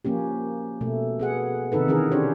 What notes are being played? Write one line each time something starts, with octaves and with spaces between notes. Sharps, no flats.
F3 A#3 C#4 G4
B2 A3
B3 G#4 F#5
C3 D#3 D#4 A4 B4
D#3 E3 C#4 G#4 A#4
C#4 D4 G4 C5 C#5